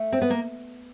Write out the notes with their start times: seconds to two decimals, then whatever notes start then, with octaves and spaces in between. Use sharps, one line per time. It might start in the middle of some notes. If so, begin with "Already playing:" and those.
Already playing: A3
0.12 C4
0.21 B3
0.30 A#3